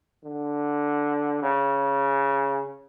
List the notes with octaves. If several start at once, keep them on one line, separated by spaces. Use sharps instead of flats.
D3
C#3